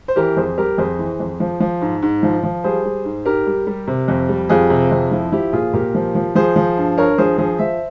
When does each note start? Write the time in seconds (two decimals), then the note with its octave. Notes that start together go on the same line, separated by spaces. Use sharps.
0.08 C5
0.16 E3 G4 A#4
0.37 F2 G#4 C5
0.58 G3 G4 A#4
0.78 F2 G#4 C5
0.99 E3
1.20 F2
1.40 F3
1.60 F3
1.81 G#2
2.02 G#2
2.23 F3
2.43 F3
2.64 G3 G#4 C5
2.85 G3
3.05 G#2
3.25 G#2 G4 A#4
3.47 G3
3.67 G3
3.87 C3
4.08 F2
4.29 G3
4.49 F2 F4 G#4
4.70 C3
4.91 F2
5.12 F3 E4
5.32 F3 E4 G4
5.53 A#2 F4 G#4
5.73 A#2 G4 A#4
5.95 F3
6.15 F3
6.35 F3 G#4 C5
6.56 F3
6.77 G2
6.98 G2 A#4 C#5
7.18 F3 G#4 C5
7.38 F3 G#4 C5
7.59 F3 C5 E5